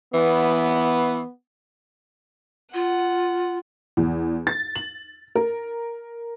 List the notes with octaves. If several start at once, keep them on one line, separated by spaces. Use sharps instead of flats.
E3 B3
F4 F#5
E2
A6
F#7
A#4